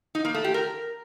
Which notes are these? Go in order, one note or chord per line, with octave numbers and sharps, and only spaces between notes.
D#4
A#3
A3
G4
A#4